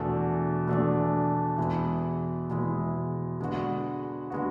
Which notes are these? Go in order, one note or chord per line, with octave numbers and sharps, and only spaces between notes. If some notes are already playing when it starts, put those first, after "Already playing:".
Already playing: E2 B2 A3 D4 F#4
E2 B2 A3 D4 F#4
E2 B2 G#3 B3 E4
E2 B2 G#3 B3 E4
D3 G#3 B3 F#4
D3 G#3 B3 F#4